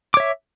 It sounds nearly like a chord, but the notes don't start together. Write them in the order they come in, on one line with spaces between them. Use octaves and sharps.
D6 C#5 E5